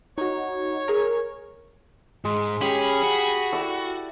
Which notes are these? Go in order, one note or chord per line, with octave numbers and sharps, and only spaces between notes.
D#4 F#4 C#5
G#4 A#4
G#2 G#3
C#4 G4 G#4 B5
F#4
E4 A4 D5